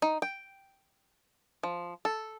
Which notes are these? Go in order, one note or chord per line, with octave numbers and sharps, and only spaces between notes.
D#4
G5
F3
A4